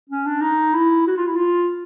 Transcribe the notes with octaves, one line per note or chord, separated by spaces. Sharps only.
C#4
D4
D#4
E4
F#4
F4
E4
F4